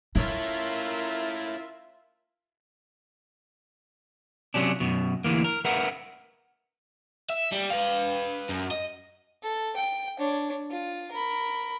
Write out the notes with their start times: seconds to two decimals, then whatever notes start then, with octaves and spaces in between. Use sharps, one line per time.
0.16 C#4 E4 F4 A#4 C#5 E5
4.54 C3 F#3 C#4 D4
4.80 F#2 B2
5.24 D2 E3 A#3
5.44 A#4
5.65 A#4 B4 E5 F#5 A#5
7.30 E5
7.52 G3
7.71 B4 F5
8.49 F#2
8.71 D#5
9.43 A4
9.76 G5
10.19 D4 C#5
10.71 F4
11.12 A#4 B5